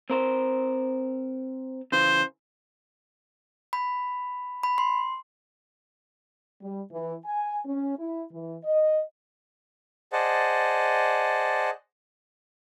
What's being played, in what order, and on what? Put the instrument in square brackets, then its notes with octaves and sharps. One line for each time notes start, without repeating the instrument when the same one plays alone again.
[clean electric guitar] C4 A#4 C5
[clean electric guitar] C#3 E3 [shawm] C5
[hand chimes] B5
B5
C6
[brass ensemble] G3
E3
G#5
C#4
E4
E3
D#5
[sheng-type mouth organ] G#4 C5 D5 D#5 F#5 A5